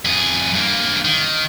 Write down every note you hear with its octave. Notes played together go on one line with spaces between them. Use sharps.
F2 G#4
G2 A#3
D#3